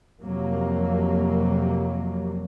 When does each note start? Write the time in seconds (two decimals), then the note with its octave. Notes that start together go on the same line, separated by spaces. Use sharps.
0.21 F2 C3 F#3 A#3